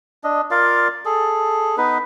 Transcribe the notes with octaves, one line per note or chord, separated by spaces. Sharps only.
D4 D#5
F4 A#4 D5 F5
G#4 A4
B3 D#4 B4